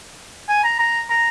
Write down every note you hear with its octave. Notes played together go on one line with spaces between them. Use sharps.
G#5
A#5
A#5
A#5